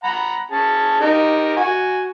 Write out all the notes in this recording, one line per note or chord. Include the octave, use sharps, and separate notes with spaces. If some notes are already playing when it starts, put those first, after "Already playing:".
F#5 A#5 B5
C#4 G#4 A5
D#4 G4 A#4
F#4 G#5